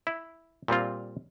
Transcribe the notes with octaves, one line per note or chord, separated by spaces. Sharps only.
E4
A#2 G3 C4 F4